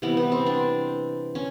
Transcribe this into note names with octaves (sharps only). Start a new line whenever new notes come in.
C3 E3 G3 B3
B3
C4
D4
C#4